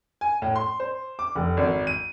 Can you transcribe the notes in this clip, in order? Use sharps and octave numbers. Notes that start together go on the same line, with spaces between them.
G#5
A2
C6
C5
D6
F1
G#1
D#7